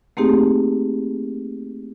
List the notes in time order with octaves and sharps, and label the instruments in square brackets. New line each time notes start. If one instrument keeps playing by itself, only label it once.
[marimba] A3 A#3 C4 D#4 G4 G#4